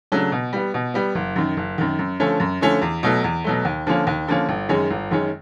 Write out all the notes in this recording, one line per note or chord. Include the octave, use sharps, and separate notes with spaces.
C#3 F#3 A3 D4
B2
G3 B3
B2
G3 B3
F#1
F#2 D#3
F#1
F#2 D#3
F#2
D3 F3 A3 C#4
F#2
D3 F3 A3 C#4
E2
B2 F#3 A3
E2
B2 F#3 A3
D#2
D3 F3 A#3 C#4
D#2
D3 F3 A#3 C#4
G1
F#2 D#3 G#3 C#4
G1
F#2 D#3 G#3 C#4